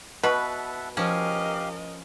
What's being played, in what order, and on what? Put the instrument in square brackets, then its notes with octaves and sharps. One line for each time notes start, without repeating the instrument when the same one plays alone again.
[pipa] B2 [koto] B4 [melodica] E5 F#5 A5
[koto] F3 C#4 [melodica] G4 F5 [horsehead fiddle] A#4 D#5